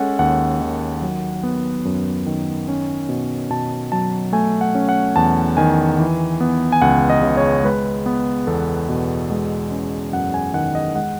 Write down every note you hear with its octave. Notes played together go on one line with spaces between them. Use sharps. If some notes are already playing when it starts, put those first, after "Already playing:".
Already playing: G#3 C#4 A4 F#5
D#2 F#5
D#3
F#3
B3
F#2
D#3
C#4
B2
B2 A5
F#3 A5
A3 G#5
F#5
C#4
F#5
E2 A5
D#3 G#5
E3
B3
G#5
C#2 F#5
D#5
C#3
C#5
G#3 B4
B3
E2 A4
B2
G#3
C#4
F#2 F#5
G#5
D#3 F#5
D#5
G#3 F#5